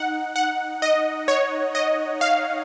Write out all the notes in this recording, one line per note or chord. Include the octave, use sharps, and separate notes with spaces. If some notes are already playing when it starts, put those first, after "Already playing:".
Already playing: D#4 F#5
F#5
D#5
C#5
D#5
F5